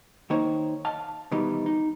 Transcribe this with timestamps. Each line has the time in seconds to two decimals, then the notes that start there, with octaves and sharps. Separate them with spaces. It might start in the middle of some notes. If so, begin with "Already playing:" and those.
0.30 D#3 A#3 D#4 C5 C#5
0.85 D#5 F5 A5
1.31 B2 D#3 E3 G3 D#4
1.66 D#4